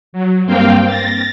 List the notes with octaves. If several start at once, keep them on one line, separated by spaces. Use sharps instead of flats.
F#3
G2 A#3 C4 F5 G5
A6 A#6